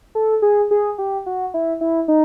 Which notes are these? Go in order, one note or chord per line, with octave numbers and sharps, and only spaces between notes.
A4
G#4
G#4
G4
F#4
E4
E4
D#4